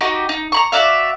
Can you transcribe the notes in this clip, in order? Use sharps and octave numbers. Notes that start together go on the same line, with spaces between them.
D#4 F#4 G4 D#5
D#4
A#5 B5 C#6
F#4 D5 E5 F5